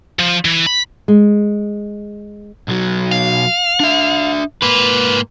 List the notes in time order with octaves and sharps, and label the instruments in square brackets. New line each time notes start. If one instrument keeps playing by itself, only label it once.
[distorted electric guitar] F3
E3
B5
[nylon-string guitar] G#3
[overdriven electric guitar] B1 F#3
[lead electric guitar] F5
[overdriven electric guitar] D4 E5
[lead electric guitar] G#2 A#3 [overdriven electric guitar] B4